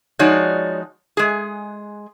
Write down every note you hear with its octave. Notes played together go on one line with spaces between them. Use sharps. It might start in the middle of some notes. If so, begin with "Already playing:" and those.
F3 G#3 D#4 F#4 C#5 D5
G#3 G#4